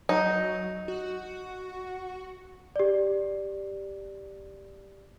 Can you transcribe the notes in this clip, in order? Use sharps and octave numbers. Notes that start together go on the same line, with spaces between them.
F#3 D#4
F#4
G4 D5